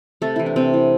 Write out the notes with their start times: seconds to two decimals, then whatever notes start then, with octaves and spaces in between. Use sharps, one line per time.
0.22 C3 A3 A4
0.36 E3 E4
0.46 D4
0.56 C3 C4
0.73 E3